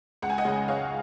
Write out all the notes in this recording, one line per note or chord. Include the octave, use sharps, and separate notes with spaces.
C#2 F#5
G#5
D#5 F#5
C#3 G#3
C#2 C#5 F5